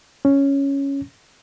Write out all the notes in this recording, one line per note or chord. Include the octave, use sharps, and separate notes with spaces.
C#4